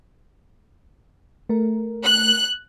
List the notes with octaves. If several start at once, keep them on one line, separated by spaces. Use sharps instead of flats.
A3 A#4
F#6